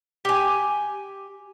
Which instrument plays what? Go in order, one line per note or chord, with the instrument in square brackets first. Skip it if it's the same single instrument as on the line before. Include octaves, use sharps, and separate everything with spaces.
[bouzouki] G4 G#5